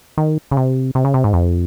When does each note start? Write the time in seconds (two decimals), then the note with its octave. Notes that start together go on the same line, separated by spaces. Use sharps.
0.18 D#3
0.51 C#3
0.57 C3
0.95 C3
1.05 C#3
1.14 C3
1.24 G#2
1.33 F2